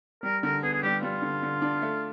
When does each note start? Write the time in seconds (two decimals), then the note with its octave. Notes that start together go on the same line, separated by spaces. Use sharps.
0.23 G3 A#4
0.43 D3 A#4
0.63 B3 G#4
0.73 G#4
0.82 G3 G4
1.03 G3 F4
1.22 D3
1.43 D3
1.62 D4
1.82 A3